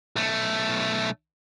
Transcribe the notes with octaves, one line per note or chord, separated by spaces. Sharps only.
B1 A3